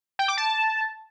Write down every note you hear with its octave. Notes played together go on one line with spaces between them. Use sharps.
G5
D6
A5